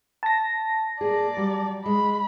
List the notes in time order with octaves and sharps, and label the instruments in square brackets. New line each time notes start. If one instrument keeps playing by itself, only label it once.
[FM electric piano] A5 A#6
[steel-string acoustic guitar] A#3 G#4 [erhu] D5
[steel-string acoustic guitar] F#3 G3
[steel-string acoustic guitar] G#3 [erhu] B5